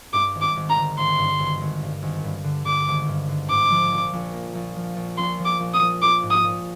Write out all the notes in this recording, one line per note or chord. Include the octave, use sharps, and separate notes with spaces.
G2 D6
G#1
D6
G#1
A#5
D3
G#1 C6
G2
G#1
G#1
G2
G#1
G2
D3
D3 D6
G#1
G2
D3
G#2 D6
F3
A#1
A#1
A#3
A#1
F3
A#1
A#1 C6
F3
D6
A#1
D#6
F3
A#3 D6
G#2
D#6
A#1